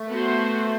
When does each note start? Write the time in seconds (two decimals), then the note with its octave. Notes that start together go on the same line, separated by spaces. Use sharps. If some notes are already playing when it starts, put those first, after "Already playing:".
Already playing: A3
0.09 B3 F#4 C5